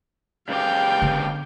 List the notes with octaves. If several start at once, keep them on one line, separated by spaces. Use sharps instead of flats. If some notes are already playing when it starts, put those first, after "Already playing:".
C#2 G4 F5 G5
D3 B3